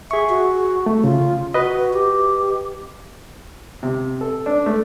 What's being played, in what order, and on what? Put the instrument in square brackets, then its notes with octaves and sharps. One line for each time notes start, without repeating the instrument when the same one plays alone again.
[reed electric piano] G#4 C#6 [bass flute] E5
[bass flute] F#4
[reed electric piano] A3
[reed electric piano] C#3 [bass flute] F4
[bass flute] F#4 [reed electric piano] B4 D#5
[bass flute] G4
[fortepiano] C3
A4
D4
A3